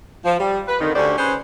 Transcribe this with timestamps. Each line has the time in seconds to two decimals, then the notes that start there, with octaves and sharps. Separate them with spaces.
0.25 F3
0.39 G3
0.68 B4
0.80 F2 D3 D#3
0.95 D2 D3 C#4 G4 C5 D5
1.17 C#4 G#4 B4 C5